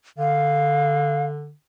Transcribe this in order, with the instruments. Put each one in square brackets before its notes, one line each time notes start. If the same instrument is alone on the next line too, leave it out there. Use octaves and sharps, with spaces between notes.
[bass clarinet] D3 [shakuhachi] F5